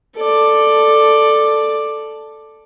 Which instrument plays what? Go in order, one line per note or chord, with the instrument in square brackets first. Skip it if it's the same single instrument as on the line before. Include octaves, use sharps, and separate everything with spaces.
[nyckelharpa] A4 D5